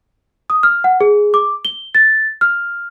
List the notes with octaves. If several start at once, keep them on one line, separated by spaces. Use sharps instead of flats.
D#6
F6
F#5
G#4
D6
G7
A6
F6